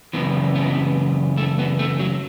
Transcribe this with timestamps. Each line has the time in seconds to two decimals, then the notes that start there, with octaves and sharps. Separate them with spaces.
0.13 F#2 C#3 E3 B3
0.55 B3
1.37 A3
1.59 B3
1.79 A3
1.99 F#3